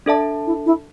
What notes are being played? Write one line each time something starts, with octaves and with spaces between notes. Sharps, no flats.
D4 A4 D5 E5 A5
E4
E4